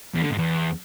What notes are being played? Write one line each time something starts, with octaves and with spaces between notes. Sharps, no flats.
E2
D3
G#2
E2